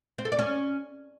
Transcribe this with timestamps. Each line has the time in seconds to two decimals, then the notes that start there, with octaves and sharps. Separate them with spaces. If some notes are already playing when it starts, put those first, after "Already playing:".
0.18 C4
0.25 A4
0.32 D5
0.39 C#4